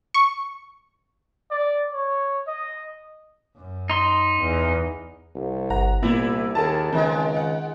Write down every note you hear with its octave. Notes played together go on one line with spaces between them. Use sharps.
C#6
D5
C#5
D#5
F#2
D#4 C6
E2
C2
G1 F#5 A#5
C2 A#2 A#3 B3 E4
D#2 G#4 A#4 A5
C#2 D#3 G#3 C4
F#5